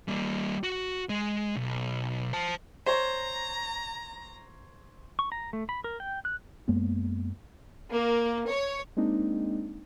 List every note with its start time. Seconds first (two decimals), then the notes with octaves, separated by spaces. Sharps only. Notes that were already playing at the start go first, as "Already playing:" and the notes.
0.08 G3 A#3
0.64 F#4
1.09 G#3
1.56 B1
2.33 C5 A5
2.86 C5 C#5 A#5
5.19 C#6
5.32 A#5
5.53 A3
5.69 B5
5.84 A#4
6.00 G5
6.25 F#6
6.68 F#2 G#3 A#3 B3
7.92 A#3
8.49 C#5
8.97 G#3 A#3 C4 D4 D#4